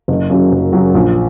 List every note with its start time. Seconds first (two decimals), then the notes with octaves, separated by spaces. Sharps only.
0.08 F#1
0.30 F#2 C#3 F#3
0.52 F#1
0.73 F#2 C#3 F#3
0.95 A#1